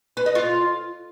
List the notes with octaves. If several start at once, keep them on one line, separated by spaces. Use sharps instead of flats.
B4
D#5
F4